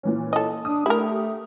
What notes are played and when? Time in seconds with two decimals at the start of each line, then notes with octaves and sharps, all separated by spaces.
0.03 A#2 E3 C#4
0.33 A4 D#5
0.65 D4 D#6
0.86 A3 E4 G4 A#4